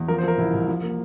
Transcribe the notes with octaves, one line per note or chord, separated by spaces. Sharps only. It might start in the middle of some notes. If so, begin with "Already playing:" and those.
Already playing: E2
F3 A#4
C5
F3 A#4
C2 E4
C2
F3
A#3